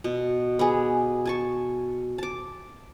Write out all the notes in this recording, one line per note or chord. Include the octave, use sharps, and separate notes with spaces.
B2
B3 G4 G#4
G#5 A5 C#6
A5 D6